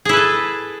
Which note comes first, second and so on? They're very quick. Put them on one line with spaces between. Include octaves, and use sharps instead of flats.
G#4 E4 B4 A4